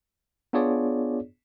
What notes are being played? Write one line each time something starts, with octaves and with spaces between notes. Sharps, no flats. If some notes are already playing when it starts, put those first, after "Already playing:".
B3 D4 F4 G#4 C#5 D5